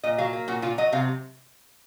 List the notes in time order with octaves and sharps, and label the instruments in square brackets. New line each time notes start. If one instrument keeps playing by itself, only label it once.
[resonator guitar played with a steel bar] A#2 D#5
F#3 F5
A#3
A#2 F#4
A#2 F4
F#3 D#5
C3 F5